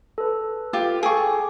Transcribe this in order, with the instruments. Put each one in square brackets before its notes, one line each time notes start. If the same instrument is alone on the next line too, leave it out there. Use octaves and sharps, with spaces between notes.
[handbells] A4 B4
[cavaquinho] F4 G4
[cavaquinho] G#4 C#6 [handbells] A4 G5 D6